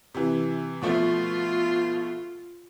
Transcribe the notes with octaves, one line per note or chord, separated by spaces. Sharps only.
C3 E3
B2 F3 A3 F4